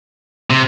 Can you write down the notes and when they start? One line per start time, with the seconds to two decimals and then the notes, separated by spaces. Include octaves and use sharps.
0.50 C3